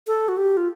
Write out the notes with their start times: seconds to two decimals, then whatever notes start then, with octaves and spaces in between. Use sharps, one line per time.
0.07 A4
0.28 F#4
0.37 G4
0.57 F4